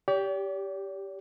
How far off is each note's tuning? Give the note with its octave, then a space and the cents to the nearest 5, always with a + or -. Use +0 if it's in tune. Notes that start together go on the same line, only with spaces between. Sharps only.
G4 +0 D5 -45